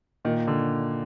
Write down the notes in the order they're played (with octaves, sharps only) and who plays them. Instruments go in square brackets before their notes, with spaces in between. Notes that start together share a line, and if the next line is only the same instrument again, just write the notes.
[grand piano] A#2 [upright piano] D#3
[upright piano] D3